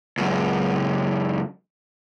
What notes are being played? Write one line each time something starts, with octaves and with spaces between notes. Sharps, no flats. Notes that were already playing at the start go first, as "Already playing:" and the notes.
C#2 F#2